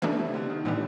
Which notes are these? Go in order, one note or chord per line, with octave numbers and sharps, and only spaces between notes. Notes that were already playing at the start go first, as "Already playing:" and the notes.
B2 E3 A3 D4
C3
D3
D#3
A2 D3 E3 G3 B3